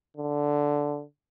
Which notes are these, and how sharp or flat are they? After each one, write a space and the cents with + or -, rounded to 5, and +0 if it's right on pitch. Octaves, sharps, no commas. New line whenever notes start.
D3 -5